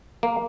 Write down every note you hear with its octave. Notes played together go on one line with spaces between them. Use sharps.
A#3